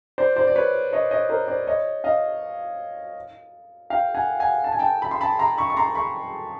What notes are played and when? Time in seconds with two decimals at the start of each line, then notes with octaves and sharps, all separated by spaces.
0.18 C5 D5
0.36 C5 D5
0.47 D5
0.55 B4 C#5
0.93 C#5 D#5
1.11 C#5 D#5
1.29 A#4 C5
1.48 C5 D5
1.67 C#5 D#5
2.04 D#5 F5
3.90 F5 G5
4.15 F#5 G#5
4.40 F#5 G#5
4.64 A5
4.72 G#5
4.79 G5 A5
5.02 B5
5.11 C6
5.21 A5 B5
5.39 A#5 C6
5.58 B5 C#6
5.70 C#6
5.77 A#5 C6
5.95 B5 C#6